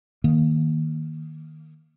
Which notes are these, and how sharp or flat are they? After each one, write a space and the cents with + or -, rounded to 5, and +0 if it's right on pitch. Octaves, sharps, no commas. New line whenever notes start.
D#3 +0 A#3 +0